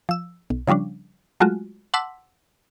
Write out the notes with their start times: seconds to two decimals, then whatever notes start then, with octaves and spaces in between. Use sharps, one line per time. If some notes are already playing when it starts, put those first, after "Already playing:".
0.09 F3 E6
0.50 B1
0.67 C#3 F3 G3 C#4 D4
1.40 F#3 G#3 A3 F4 F#4
1.94 F#5 A5 C6 D6 E6 B6